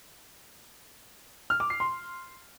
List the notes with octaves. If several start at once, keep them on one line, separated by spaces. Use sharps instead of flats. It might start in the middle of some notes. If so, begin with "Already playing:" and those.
F6
D6
C7
C6